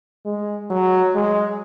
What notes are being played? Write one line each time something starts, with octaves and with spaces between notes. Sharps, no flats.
G#3
F#3
G#3